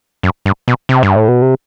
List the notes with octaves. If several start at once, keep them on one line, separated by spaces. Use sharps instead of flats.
F#2
G2
B2
C3
G2
A2
B2
C3